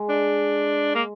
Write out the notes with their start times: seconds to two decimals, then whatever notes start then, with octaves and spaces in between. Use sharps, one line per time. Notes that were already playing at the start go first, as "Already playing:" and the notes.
Already playing: G#3
0.09 D4
0.95 A#3